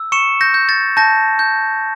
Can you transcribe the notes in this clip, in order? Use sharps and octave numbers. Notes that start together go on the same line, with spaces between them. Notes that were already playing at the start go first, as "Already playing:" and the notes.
Already playing: E6
C#6 C#7 E7
G6 A#6
G6
A6
A5 G6 A#6
G6